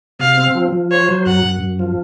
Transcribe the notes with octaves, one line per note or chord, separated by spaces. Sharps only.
C3 F5
C4
F3
F3
C5 C#5
F#3
F#2 F#5
F#2
F#2
F3